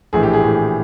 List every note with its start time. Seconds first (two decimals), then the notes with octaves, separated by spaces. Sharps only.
0.13 A#1 A2 E3 G#4
0.23 G4
0.33 G#4
0.43 A#1 A2 E3